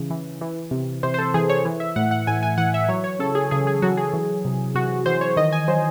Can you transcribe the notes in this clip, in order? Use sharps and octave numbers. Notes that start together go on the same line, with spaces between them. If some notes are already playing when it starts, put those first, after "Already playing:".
Already playing: C#3 E3
E3
E3
C3
C3 C5
C5
A4
E3 G#4
C#5
E3
E5
A2 F#5
F#5
A2 G#5
G#5
E3 F#5
E5
F#3 C#5
C#5
C#3 A4
G#4
C#3 G#4
G#4
F#3 F#4
G#4
E3
C3
C3 F#4
E3 C5
C#5
D#3 D#5
G#5
F#3 C5